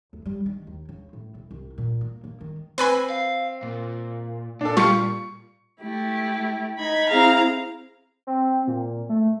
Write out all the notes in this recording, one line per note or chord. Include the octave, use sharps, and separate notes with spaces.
D2
G3
D#3
D#2
C#3
A2
E1
C2
A#2
A#3
A#3
D#3
C4 B4 G#5 B5
F5
A#2
A#2 D4 A4
G3 F4 C#6 C#7
A3 E4 G4
D#4 B5 G#6
C4 E4 G#4 F5 A#5
C4
A#2
A3